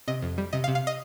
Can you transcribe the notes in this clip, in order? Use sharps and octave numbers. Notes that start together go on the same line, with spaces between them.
C3 D#5
F2
G3
C3 D#5
F5
C3
F5
D#5